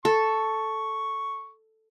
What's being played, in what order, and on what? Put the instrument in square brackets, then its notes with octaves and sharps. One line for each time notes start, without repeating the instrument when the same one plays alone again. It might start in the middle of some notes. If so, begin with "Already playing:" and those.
[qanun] A4 [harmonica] C#6